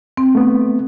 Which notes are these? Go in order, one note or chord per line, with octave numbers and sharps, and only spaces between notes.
C4
A3 B3